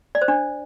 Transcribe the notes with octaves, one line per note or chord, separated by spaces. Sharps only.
D5
C5
D4